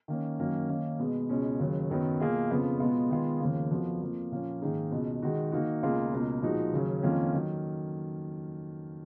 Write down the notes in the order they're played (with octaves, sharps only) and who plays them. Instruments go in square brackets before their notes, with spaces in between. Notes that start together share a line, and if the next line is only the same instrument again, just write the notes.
[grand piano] D#3 A#3 C#4
F#2 D#3 A#3 C#4 F#4
D#3 A#3 C#4
B2 G#3 B3
C#2 B2 G#3 C#4
D#2 C#3 F#3
F#2 D#3 F#3 B3
B2 A#3 F4 G#4
F2 C#3 F3 B3 F4
B2 G#3 B3 F4 G#4
D#3 G#3 B3 F4 G#4
D#2 C#3 F3 A#3
F2 F3 B3 F#4
F2 F3 A#3
A#2 F3 A#3 C#4
G#2 D#3 A#3 D#4 G#4
C#2 B2 G#3
D#3 G#3 D#4 F#4
D#3 A#3 D#4 F#4
C#2 B2 A#3 F4 G#4
C#2 B2 A#3
A#2 F3 G#3 D#4 F#4
D#2 C#3 F#3 C#4
F2 D#3 A#3 C#4 F4
D#3 F#3